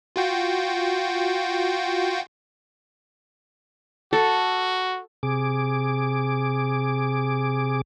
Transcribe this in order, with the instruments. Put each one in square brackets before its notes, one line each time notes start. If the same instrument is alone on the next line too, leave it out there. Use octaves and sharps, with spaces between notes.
[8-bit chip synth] F4 F#4 G5
[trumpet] F#4 [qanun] A4
[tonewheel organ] C3 G#4 D6